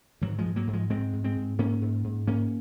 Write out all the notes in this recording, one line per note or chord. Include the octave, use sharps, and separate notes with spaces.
G#2 D#3 F#3
F3 G#3
G#2
F#3 A#3
G#2
F3 G#3
G#2 G#3 C4
G#2
G#3 C4
G#2
G#2 A#3 C#4
G#2
G#2
G#2 A#3 C#4